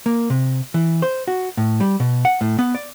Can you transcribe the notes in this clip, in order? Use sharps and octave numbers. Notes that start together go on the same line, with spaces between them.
A#3
C3
E3
C5
F#4
A2
G3
B2
F#5
A2
B3
D5